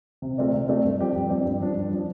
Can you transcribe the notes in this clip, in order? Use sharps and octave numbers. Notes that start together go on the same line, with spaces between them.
C3
A3 C4 F4 D5
C3
A3 C4 F4 D5
G2
F3 C4 G4 D5
G2
F3 C4 G4 D5
G2
F3 D4
G2
F3 D4